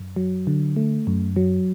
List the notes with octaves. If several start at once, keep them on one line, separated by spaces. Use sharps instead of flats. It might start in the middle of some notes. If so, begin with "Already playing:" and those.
Already playing: F#2
F#3
D3
A3
F#2
F#3